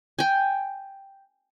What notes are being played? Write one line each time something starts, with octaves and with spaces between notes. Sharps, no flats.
G5 G#5